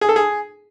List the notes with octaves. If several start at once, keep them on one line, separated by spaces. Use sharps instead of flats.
G#4
A4
G#4